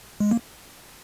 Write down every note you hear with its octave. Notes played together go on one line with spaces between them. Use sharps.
G#3
A#3